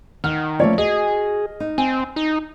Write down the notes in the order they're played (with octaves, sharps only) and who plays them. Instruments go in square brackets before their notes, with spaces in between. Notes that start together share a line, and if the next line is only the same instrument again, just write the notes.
[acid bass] D#3 [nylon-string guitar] F#5 [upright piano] F6
[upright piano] F3 C#5 D5 [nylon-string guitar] A3 A#3 C#4
[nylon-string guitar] F#4 [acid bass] G#4 [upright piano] D#5
[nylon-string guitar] D#4
[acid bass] C4 [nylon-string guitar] G#5
[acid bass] D#4